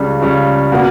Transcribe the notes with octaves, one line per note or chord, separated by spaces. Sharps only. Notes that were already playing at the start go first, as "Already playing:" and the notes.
Already playing: C#2 C#3 G3
C#2 C#3 G3
B2 A#3